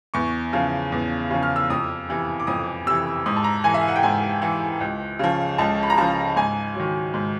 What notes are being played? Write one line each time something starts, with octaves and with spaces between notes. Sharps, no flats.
E2 C#6
C#3 F3
E2
C#3 F3
F6
E6
F2 D#6
C3 E3
D6
F2 D#6
C3 E3 E6
G#2 D#6
A5
A#5
E3 G#5
E5
F5
F#5
G5
G#2 G#5
E3
C#2
C#3 F3
C#2 A5
B5
A#5
C#3 F3 A5
G#2 G#5
D#3 F#3
G#2